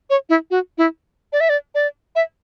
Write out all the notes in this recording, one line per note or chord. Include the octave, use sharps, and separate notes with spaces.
C#5
E4
F#4
E4
D5
E5
D5
D5
E5